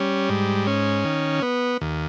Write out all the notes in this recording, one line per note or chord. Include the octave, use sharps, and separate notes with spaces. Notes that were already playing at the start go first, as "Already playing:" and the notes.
Already playing: G3 C#4
G#2
C#4
D#3
B3
D#2